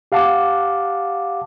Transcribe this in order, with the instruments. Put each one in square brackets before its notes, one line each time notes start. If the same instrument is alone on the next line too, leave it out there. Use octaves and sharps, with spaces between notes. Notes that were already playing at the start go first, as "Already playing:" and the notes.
[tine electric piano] G4 F5 F#5 A5 D6